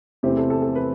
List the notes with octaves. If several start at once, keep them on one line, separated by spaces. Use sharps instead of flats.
E2 C3 E3 A3 C4 G4
A4
A4
A4
B4